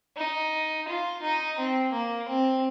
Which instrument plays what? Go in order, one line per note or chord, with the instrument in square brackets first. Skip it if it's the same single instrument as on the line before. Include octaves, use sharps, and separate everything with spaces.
[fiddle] D#4
F4
D#4
C4
A#3
C4